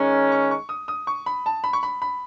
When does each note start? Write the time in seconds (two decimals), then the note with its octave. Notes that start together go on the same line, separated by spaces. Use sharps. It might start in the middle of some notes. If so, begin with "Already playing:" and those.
Already playing: D#3 G#3 C#4
0.32 C#6
0.51 C#6
0.69 D#6
0.88 D#6
1.07 C#6
1.26 B5
1.46 A5
1.64 B5
1.73 C#6
1.83 B5
2.02 B5